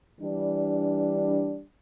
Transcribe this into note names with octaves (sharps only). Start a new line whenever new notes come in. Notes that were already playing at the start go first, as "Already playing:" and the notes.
E3 G3 D4